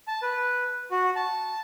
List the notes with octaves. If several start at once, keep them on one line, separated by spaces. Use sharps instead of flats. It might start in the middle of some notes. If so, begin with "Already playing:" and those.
A5
B4
F#4
A5